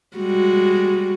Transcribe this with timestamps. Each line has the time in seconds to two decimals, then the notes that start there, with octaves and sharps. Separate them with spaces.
0.17 G3 G#3 F#4